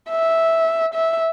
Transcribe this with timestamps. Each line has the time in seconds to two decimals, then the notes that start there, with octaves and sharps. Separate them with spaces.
0.10 E5
0.94 E5